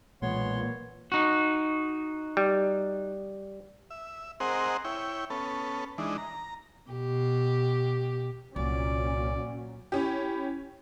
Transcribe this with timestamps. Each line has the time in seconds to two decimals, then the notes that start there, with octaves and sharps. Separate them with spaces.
0.22 B1 A#2 E3 G#3 B3 C#5 C6
1.12 D#4 F#4
2.37 G3
3.90 E5
4.40 C4 G#4 A#4 C5 D#5 F#5
4.85 E4 C#5 G5
5.30 B3 C#4 A4
5.98 E3 G#3 D4 D#4
6.18 A#5
6.91 B2 G4
8.56 C2 A#2 F#3 C#4 D5
9.92 C#4 E4 G4